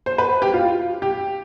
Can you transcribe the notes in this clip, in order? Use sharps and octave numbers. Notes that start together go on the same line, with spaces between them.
C5
B4
G4
F4
G4